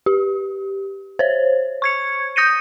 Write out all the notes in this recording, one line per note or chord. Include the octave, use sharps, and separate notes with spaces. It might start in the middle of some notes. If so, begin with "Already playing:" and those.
G4
C5 C#5
C#6 G#6 C#7
D#6 G6 A#6 C#7 D#7